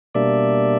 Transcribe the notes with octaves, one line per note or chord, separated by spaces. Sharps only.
B2 G3 A#3 D4 D5 E5